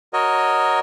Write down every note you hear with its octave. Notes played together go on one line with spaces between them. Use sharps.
F#4 A#4 C#5 D#5